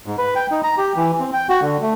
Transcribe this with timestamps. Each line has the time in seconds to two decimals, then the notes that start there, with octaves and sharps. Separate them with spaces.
0.06 G#2
0.18 B4
0.36 G5
0.51 D#4
0.63 A#5
0.78 G4
0.96 E3
1.20 C4
1.34 G5
1.49 F#4
1.62 D3
1.82 A3